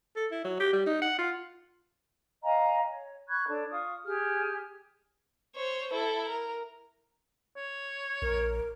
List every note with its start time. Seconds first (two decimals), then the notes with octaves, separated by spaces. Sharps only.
0.16 A4
0.31 E4
0.44 F#3
0.60 G4
0.73 G3
0.86 D#4
1.02 F#5
1.18 F4
2.43 D#5 F5 G#5 A#5
2.90 C#5
3.28 B5 C#6 F#6 G#6
3.47 D4 A4 C#5
3.71 F4 C#6 D#6
4.04 G4 G#4 F6
5.56 C5 C#5
5.93 E4 A4
6.29 A#4
7.56 C#5
8.22 A#1 A#4